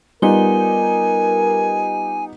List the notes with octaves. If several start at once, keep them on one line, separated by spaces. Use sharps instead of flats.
G3 B3 D#4 F4 G4 A#4 G#5 G7